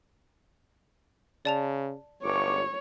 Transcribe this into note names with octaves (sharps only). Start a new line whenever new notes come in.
C#3 D5 A5 F7
G1 C#2 C#5 C#6 D6